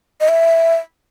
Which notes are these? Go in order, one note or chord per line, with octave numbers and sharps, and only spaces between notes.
D#5
E5